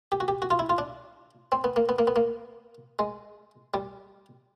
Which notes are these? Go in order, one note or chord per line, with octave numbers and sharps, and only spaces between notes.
G4
F#4
G4
F#4
F4
E4
F4
D4
C4
B3
A#3
B3
A#3
B3
A#3
G#3
G3